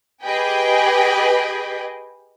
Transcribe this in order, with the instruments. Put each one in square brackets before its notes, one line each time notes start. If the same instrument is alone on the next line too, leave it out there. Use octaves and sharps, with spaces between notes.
[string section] G4 G#4 B4 D#5 G5 G#5